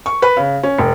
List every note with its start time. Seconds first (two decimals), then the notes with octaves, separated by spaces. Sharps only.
0.06 C#6
0.22 B4
0.37 C#3
0.63 C#4
0.78 E1